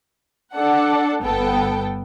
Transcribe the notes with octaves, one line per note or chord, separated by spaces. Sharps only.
D4 A4 F#5
G1 B3 A4 G5